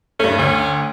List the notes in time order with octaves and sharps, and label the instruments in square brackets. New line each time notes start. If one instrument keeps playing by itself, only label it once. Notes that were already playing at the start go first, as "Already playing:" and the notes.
[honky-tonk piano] G2 A3 [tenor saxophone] C#4
[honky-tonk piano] D2 [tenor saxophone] C#4